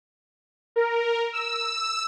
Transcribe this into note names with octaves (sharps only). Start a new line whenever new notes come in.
A#4
E6